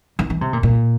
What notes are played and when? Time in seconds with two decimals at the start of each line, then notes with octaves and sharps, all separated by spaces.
0.19 E3
0.30 E3
0.41 C3
0.53 A#2
0.63 A#2